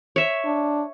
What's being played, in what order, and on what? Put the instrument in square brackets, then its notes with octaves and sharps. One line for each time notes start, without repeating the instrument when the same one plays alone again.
[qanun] C#5 E5
[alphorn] D4